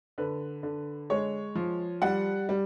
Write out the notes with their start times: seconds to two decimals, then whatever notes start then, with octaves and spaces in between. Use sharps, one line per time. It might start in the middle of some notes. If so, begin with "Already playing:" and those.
0.18 D3 B4
0.63 D3
1.10 G#3 C#5
1.55 F3
2.02 G3 F#5
2.49 G3